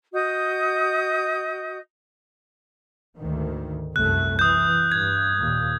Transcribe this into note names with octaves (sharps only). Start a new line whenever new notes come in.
F#4 D#5 D#6 G6
D2 G#2 D#3
C2 F#2 A3 F#6
E3 D#6 G6
G2 G#6
D#2 A#2